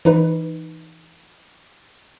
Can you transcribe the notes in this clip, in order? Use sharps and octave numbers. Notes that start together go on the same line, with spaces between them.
E3 D#4 B4